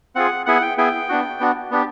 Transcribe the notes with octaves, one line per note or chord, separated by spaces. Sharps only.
C4 F4 G#4 F#5
B3 E4 G#4 F#5
G5
B3 E4 G#4 G5
B3 D4 F#4
B3 D4 F#4
B3 D4 G4